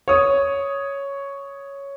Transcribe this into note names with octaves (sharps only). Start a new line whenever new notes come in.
C#5 D#6